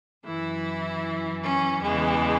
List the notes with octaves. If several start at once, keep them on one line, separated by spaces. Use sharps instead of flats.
F#2 E3 E4
C#4
E2 C#3 E3 G#3